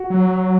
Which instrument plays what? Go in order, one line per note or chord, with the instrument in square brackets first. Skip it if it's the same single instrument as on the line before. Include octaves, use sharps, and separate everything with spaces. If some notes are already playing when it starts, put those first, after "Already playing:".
Already playing: [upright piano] F#4
[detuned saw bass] F#3